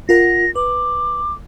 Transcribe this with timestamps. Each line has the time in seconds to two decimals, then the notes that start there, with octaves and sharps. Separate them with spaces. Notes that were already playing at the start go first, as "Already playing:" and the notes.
0.09 F4 A#4 F#5 A#6
0.56 B4 D6